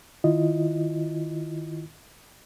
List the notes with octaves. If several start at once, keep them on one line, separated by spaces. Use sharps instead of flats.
D#3 E4 F4 D#5